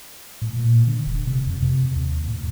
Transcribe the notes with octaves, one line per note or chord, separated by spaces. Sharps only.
A2
A#2
D3
E1
C3
F2
C3
D#2
A2